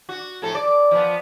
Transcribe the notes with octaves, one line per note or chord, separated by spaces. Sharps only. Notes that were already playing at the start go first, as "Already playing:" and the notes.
F#4
F2 A2 A4
D5
F3 B3